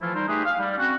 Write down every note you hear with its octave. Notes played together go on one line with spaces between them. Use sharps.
E3 F3 A3 E4 F4
G3 D#4 A#4 C5
A3 D#4 G4 G#4 B4
F5
G3
C4 C#4 F#4